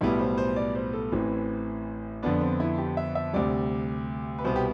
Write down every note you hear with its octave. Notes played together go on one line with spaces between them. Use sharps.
B1 A2 G3 B3 E4
C5
C5
D5
C5
A4
A1 A2 E3 C4
F2 D3 F3 B3 D4
C4
E4
G4
E5
E5
D2 C3 G3 D5
B4
C2 B2 B3 C5
G4